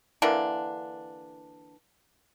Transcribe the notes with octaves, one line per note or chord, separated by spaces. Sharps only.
D3 E3 A#3 D4